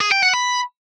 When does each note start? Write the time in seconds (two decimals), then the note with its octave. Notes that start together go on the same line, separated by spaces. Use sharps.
0.01 G#4
0.12 G5
0.23 F#5
0.34 B5